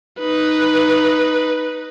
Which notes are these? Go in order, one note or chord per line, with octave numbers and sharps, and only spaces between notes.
D#4 B4